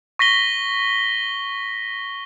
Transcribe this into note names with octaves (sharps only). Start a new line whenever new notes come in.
C#6 A#6 B6 G7